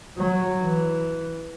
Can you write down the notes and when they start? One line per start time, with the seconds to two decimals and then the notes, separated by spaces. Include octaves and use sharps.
0.18 F#3
0.62 E3